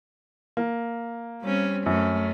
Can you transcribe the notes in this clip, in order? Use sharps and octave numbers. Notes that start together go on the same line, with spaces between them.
A#3
G3 C4 C#4
F#2 A3 C#4